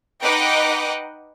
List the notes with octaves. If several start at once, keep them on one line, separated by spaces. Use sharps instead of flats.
D#4 B4 D#5 F#5 G5 D6